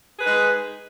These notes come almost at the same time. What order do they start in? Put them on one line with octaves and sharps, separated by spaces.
G#4 B4 D#4 G#3